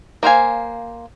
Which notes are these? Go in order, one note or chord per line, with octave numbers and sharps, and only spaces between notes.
A#3 C5 F5 G#5